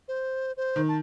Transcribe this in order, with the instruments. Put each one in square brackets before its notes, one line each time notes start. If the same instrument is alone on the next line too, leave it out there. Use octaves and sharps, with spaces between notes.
[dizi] C5
C5
[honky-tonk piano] D#3
[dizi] A5